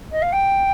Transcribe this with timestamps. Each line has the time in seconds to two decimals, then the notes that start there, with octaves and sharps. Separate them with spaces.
0.11 D#5
0.21 F5
0.32 G5